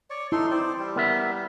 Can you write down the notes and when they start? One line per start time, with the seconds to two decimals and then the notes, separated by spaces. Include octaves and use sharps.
0.10 C#5 D5 C#6
0.32 D#4 E4 A4 C6
0.51 C4 C5 D5
0.79 G3
0.96 B3 A#4 E5